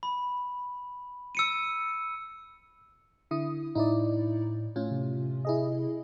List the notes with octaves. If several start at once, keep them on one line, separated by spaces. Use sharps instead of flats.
B5
E6 C#7 D#7
D3 E4 D#6
A2 D#4 E4 D5
A2 C#4 F4
C3
E4 G#4 D#5